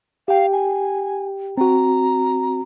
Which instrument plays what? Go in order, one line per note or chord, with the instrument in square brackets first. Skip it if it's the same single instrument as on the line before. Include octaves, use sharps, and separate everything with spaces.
[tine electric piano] G4 G5 [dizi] F5
[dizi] G#5
[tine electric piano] C4 F#4 [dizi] A#5